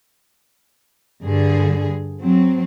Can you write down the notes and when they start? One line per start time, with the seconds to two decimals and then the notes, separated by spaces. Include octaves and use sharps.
1.23 G2 D3 G#4
2.21 F#3 C4